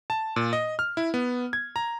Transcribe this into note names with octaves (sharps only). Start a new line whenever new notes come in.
A5
A#2
D#5
F6
E4
B3
G#6
A#5